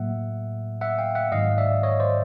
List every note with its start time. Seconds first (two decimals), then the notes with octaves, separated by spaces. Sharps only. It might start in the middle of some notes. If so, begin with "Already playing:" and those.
Already playing: A2 F#3 A#3 E5 F#5
0.81 E5 F#5
0.98 F5 G5
1.15 E5 F#5
1.32 G#2 D#3 F#3 D#5 F5
1.58 D5 E5
1.83 C#5 D#5
2.00 C5 D5